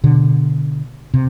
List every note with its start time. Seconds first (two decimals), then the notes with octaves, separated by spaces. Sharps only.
0.04 B2 D3
1.14 C3